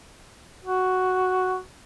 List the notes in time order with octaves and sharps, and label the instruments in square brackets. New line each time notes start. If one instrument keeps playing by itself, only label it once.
[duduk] F#4